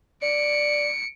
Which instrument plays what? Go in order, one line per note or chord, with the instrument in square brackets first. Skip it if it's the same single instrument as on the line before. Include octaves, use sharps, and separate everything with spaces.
[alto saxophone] D5 [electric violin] C#7 D7